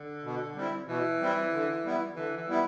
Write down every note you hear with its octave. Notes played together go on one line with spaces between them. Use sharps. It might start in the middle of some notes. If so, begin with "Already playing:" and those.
Already playing: D3
B2
G3 C4 E4
B2 E3
G3 C4 E4
D3
G3 B3 E4
D3 E3
E3
G3 B3 E4